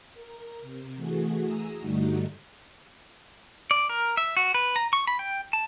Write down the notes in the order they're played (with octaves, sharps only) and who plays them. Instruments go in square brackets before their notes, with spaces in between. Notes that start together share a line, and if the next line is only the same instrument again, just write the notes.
[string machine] A#4
C3
E3 A3 F#4 G#4
G#4 A#5 D#6 E6
G2 D3 G3 A3 D#4 F#4
[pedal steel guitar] D5
A#4
E5
F#4
B4
A#5
C#6
B5
G5
A5